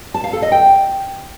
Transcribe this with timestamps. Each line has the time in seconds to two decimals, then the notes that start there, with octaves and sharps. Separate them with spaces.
0.14 A5
0.24 F5
0.33 A4
0.42 D#5
0.52 G5